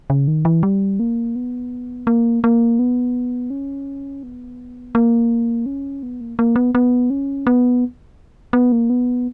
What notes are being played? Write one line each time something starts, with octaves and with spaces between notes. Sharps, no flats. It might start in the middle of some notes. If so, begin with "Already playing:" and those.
C#3
D#3
E3
G3
A#3
B3
A#3
A#3
B3
C#4
B3
A#3
C#4
B3
A#3
A#3
B3
B3
C#4
B3
B3
A#3
B3